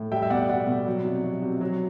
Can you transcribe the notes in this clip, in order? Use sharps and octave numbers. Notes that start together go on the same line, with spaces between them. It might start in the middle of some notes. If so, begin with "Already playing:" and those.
Already playing: A2
G3 E5 G5
E5
B2 D5 F#5
G3 D5 F#5
B2
F#3
C3
F#3
C3
F#3